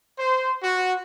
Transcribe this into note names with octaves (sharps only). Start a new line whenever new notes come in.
C5
F#4